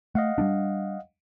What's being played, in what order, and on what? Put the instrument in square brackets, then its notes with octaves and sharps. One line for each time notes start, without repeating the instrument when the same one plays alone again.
[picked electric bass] A3 [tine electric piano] D#5 F5 F#5
[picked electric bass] G3 B3 D4